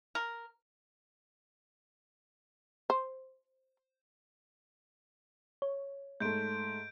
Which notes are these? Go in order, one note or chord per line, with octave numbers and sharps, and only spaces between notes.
A#4
C5
C#5
G#2 A3 G6 D7